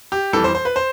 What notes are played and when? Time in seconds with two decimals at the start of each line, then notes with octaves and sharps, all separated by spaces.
0.12 G4
0.33 F2 E3 G3 A4
0.44 C5
0.55 C5
0.65 B4
0.76 C5